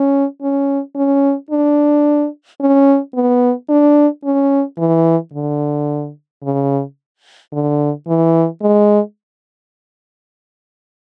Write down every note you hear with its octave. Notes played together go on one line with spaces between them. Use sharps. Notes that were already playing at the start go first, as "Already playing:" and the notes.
Already playing: C#4
C#4
C#4
D4
C#4
B3
D4
C#4
E3
D3
C#3
D3
E3
G#3